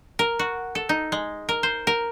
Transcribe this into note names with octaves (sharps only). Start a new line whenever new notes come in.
A#4
F#4
A4
D#4
G#3
A#4
C5
A#4